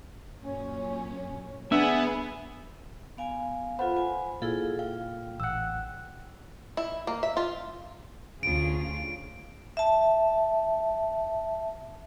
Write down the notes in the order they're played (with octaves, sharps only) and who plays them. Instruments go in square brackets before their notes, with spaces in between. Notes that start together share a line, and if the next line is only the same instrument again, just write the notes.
[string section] F#2 A#2 C#4
[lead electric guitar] B3 [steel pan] D4 [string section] G#4 [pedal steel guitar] E5
[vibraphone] B3 F5 G#5
[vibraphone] F4 A4 B4 [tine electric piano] C5 [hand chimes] F#5 B5
[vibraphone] G#5
[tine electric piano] A#2 [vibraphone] E4 G#4 A4 [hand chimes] F5
[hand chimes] F5 [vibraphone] G5
[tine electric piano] A1 F#5 [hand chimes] E6 F#6
[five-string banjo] E4
A#3
E5
F4
[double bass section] D2 [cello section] C#3 F4 G#4 [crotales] D7
[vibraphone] E5 A5